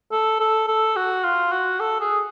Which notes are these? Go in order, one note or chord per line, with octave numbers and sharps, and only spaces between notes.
A4
A4
A4
F#4
F4
F#4
A4
G#4